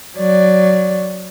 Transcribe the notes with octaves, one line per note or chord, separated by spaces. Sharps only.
F#3 D5